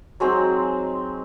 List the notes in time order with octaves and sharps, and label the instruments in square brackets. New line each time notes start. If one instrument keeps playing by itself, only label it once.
[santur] F#3 G#3 C4 D#4